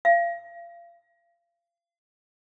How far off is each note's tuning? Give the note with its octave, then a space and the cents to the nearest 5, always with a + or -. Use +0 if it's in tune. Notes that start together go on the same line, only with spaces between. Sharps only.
F5 -30